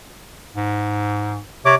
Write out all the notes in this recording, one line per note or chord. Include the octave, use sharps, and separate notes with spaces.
G#2
C3 C#5 D6